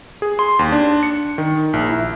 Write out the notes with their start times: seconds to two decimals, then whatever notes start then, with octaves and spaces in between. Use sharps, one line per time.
0.22 G#4
0.39 C6
0.59 D#2
0.72 D4
1.03 C#7
1.38 D#3
1.73 A#1
1.89 E4